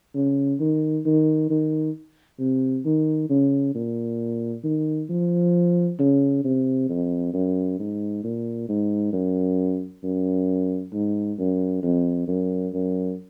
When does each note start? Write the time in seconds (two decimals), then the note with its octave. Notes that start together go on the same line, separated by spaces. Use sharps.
0.14 C#3
0.60 D#3
1.05 D#3
1.49 D#3
2.39 C3
2.85 D#3
3.29 C#3
3.75 A#2
4.64 D#3
5.10 F3
5.99 C#3
6.44 C3
6.89 F2
7.34 F#2
7.79 G#2
8.24 A#2
8.68 G#2
9.13 F#2
10.03 F#2
10.92 G#2
11.38 F#2
11.83 F2
12.27 F#2
12.73 F#2